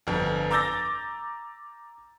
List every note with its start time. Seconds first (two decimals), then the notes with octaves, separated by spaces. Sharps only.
0.07 G1 F2
0.51 A#5 D6 E6 G6 A6 A#6